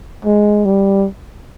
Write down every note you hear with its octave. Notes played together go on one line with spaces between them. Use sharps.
G#3
G3